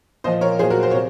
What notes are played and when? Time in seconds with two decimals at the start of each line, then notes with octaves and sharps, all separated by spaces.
0.24 A#2 F3 C5 D#5
0.41 A#4 C#5
0.59 F#3 G#4 C5
0.63 A#2
0.70 F#4 A#4
0.83 C5
0.91 C3 C#5